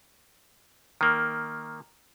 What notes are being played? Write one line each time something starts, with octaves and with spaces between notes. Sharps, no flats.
D#3 A#3